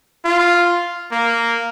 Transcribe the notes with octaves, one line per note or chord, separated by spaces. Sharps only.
F4
A#3